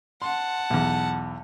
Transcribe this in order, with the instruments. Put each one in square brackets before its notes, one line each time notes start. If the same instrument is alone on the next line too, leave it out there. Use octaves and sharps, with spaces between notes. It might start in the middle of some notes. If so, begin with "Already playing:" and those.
[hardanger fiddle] F#5 A5 [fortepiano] C6
[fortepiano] B1 E2